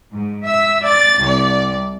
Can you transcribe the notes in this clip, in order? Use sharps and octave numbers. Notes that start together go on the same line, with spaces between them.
G#2
E5 E6
D5 A6
C2 D5